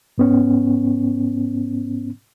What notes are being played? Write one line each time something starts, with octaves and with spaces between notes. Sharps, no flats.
G#2 B3 C#4